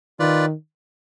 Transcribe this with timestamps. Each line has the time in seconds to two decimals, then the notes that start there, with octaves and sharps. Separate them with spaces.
0.19 D#3 F4 B4 D5